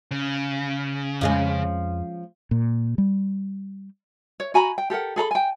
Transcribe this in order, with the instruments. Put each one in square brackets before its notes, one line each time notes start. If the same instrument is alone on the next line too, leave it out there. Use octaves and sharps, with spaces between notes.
[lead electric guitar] C#3
[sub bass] F2 [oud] F3 G#3 C#4
[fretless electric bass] A#2
G3
[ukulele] C#5
F#4 G#5 A#5 B5
G5
G4 A4 A#4 F#5
G#4 A4 A#5 B5
G5 G#5